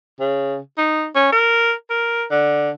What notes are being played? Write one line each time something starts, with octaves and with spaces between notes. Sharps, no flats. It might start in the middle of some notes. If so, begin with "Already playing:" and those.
C#3
D#4
C#4
A#4
A#4
D3